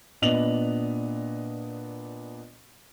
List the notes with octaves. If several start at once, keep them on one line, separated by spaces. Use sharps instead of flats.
A#2 B3 D4 D#5 F7 F#7